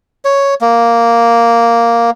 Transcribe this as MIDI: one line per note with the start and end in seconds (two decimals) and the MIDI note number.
0.25 0.55 73
0.61 2.10 58